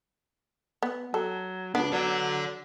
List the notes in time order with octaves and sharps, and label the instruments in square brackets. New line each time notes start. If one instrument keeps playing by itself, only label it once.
[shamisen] B3
[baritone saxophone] F#3 [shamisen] A4
[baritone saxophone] C#2 [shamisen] B3 [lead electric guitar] D4
[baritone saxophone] F#3 [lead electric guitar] A4 D5